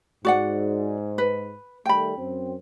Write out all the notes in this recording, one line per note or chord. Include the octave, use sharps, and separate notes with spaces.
G#2 F#4 D5 F#5
B4
D#3 G3 A3 G5 B5
F#2 C4